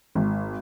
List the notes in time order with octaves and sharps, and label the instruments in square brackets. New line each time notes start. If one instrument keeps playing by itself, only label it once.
[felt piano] G#1